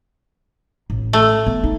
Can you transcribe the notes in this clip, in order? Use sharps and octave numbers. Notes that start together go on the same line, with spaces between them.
A1
A3
B3
D#4